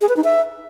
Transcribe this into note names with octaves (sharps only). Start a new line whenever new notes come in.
G#4
B4
D#4
E5